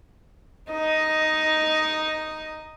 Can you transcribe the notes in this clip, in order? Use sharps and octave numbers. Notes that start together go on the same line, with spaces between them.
D#4 D#5